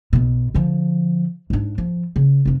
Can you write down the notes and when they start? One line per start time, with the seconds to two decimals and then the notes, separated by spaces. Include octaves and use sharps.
0.13 B1 B2
0.54 D3 F3
1.50 G#2 D4
1.78 F3
2.16 C#3
2.45 F1 C3